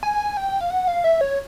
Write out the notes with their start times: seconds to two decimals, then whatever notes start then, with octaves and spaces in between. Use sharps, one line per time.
0.03 G#5
0.37 G5
0.61 F5
0.70 F#5
0.87 F5
1.04 E5
1.21 C#5